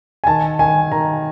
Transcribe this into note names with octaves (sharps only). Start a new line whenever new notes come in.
G#5
D#3 A5
D#3 G#5
D#3 A#5